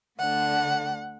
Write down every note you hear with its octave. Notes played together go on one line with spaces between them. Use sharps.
D2 D3 A3 D4 F#5